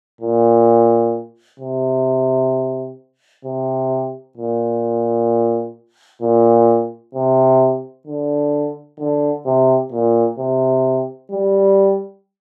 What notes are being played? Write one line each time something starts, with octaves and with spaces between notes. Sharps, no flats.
A#2
C3
C3
A#2
A#2
C3
D3
D3
C3
A#2
C3
G3